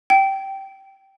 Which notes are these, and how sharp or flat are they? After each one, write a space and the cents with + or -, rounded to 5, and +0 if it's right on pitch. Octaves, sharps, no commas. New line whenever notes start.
G5 -15